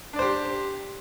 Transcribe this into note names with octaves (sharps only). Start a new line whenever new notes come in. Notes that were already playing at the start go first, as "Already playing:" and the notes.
D4 G4 C5 D5